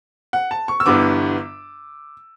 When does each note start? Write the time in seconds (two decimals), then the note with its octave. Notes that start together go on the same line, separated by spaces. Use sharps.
0.33 F#5
0.51 A5
0.68 C#6
0.80 E6
0.86 G1 G2 E3 B3 D6